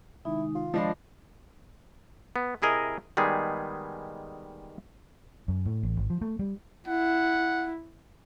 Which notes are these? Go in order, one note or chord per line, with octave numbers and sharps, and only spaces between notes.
C3 D#3 G#3 D#4 E4
F4
F3 G#3 D4 D#5 A5 B5 A#6 C7
B3
C3 E4 G#4 A#4 D#5
D#3 G3 G#3 B3 G#4
F#2
A2
A1
G#1
F3
A3
G3
E4 F#5